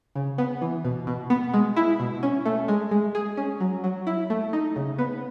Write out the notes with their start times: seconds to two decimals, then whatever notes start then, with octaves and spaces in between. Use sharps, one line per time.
0.16 C#3
0.38 B3
0.62 E3
0.85 B2
1.07 B2
1.30 B3
1.54 G#3
1.76 E4
2.00 B2
2.23 C#4
2.45 A3
2.68 G#3
2.91 G#3
3.15 G#4
3.37 C#4
3.60 F#3
3.84 F#3
4.07 E4
4.30 A3
4.53 D#4
4.76 C#3
4.99 B3